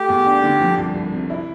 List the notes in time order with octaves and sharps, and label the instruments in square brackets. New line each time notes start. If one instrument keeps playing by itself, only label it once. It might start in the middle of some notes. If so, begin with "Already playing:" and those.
Already playing: [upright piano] A3 [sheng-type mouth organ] G4
[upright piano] E2
D4
D3
F3
C2
C2
C3
E4